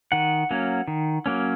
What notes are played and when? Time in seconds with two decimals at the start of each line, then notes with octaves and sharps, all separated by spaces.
0.12 D#3 F#5
0.51 F#3 A#3 C#4
0.88 D#3
1.26 F#3 A#3 C#4